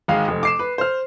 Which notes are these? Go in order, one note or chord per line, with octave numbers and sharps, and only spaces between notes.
G#1 G#3 F5
F1
D6 C7 E7
B4
C5 F6